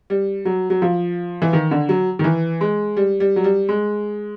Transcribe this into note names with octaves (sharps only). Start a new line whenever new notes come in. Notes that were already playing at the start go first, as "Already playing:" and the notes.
G3
F#3
F#3
F3
E3
D#3
D3
F#3
D#3
E3
G#3
G3
G3
F#3
G3
G#3